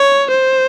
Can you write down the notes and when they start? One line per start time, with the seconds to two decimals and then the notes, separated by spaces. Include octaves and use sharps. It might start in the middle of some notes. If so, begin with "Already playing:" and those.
Already playing: C#5
0.30 C5